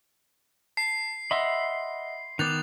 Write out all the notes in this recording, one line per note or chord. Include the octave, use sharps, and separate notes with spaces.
A5 C7
D#5 E5 F#5 B5 C6 E6
D#3 B3 D6 F#6 G6 A6 F7